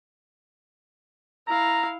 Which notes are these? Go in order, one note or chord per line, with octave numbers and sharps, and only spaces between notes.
E4 F5 A#5